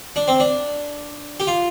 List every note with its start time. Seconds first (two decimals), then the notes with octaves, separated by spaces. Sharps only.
0.16 D4
0.28 C4
0.40 D4
1.40 G4
1.47 F4